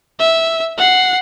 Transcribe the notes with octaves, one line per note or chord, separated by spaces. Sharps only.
E5
F#5 C7